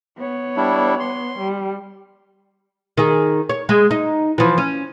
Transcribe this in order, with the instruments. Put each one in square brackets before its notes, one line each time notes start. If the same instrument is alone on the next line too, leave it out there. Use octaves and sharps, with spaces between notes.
[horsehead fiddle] B3 C#5
[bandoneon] G3 D4 E4
C6
[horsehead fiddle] G3
[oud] D#3 G#4
C#5
G#3
D#4
E3 F3
C#4